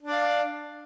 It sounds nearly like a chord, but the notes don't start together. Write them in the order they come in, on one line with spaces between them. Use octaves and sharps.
D4 D5 F5